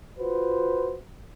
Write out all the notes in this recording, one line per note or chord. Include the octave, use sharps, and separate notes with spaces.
F4 F#4 B4 C5